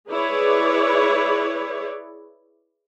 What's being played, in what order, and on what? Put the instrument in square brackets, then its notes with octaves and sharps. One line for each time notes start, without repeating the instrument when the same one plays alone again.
[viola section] E4 G#4 B4 C#5 D5